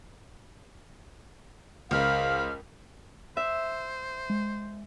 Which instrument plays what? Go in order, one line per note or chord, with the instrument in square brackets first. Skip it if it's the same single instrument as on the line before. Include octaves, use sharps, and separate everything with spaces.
[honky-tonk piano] C#2 [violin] A#4 B5 [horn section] C5 F5 [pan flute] F6
[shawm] C5 [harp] E5
[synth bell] G#3